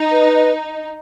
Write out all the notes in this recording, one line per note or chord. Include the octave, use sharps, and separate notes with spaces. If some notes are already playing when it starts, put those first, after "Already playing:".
Already playing: D#4
B4